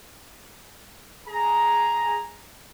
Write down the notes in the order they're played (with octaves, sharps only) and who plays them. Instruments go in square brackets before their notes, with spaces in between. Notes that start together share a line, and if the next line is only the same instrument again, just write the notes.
[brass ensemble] G#4 A#5